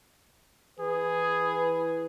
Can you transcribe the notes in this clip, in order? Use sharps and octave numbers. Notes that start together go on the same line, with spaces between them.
E3 E4 G#4 B4